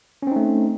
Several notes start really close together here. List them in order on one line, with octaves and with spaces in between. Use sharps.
C#4 C4 D#4 A3